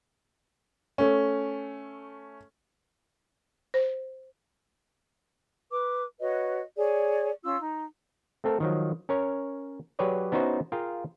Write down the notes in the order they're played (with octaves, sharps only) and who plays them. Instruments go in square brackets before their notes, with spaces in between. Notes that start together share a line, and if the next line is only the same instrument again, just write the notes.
[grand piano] A3 C#4
[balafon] C5
[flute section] B4 D6
F#4 B4 C#5 D#5
G#4 C#5 D5
C#4 F4 E6
D#4
[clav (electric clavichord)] A3 C4 A4 A#4
D#3 F3 F#3
C#4 A#4 C#5
F#3 G4 G#4 B4 C#5 D5
B3 C#4 D#4 E4 F#4 C5
F4 G#4 A#4 F5 G5